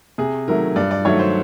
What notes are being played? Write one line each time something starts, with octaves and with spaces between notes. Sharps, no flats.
C3 G#4
D#3 F#3 A3 A#4
G2 D5
D5
D#3 F#3 A3 C#5
C5